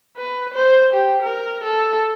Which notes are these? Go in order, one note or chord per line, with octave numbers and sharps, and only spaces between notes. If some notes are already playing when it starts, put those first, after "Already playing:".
B4
C5
G4
A#4
A4